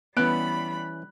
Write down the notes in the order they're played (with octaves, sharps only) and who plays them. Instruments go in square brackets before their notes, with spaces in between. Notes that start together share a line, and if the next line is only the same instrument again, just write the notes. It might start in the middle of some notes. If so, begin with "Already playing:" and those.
[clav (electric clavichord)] E3 C#4 [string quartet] G3 B5 [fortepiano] B3 [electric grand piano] F#6 D7